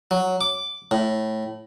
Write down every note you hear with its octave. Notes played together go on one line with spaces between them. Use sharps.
F#3
D6
A2